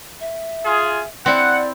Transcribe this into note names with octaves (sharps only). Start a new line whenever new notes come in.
E5
F4 G#4
C4 E4 D5 F#5